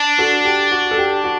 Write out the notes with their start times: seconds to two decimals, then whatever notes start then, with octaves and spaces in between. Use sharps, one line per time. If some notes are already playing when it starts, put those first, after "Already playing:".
Already playing: D4
0.18 F#4 A4
0.45 G4
0.71 F#4
0.91 A4
0.98 G4
1.24 F#4